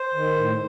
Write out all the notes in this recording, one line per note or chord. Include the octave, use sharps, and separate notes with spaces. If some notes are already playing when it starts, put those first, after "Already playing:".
Already playing: C5
D#3
A2